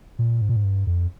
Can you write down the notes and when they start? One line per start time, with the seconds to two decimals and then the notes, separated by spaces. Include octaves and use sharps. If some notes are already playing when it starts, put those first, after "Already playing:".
0.19 A#2
0.41 G#2
0.49 A#2
0.56 G#2
0.64 G2
0.87 F2